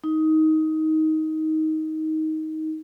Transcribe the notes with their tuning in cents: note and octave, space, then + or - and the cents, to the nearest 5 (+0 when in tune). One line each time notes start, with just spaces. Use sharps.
D#4 +15